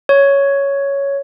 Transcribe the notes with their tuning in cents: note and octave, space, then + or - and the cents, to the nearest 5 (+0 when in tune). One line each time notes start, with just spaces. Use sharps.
C#5 +5